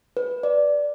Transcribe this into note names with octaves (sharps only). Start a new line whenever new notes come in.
B4
D5